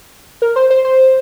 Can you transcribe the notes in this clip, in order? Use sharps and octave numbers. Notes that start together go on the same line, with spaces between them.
A#4
C5
C5
C5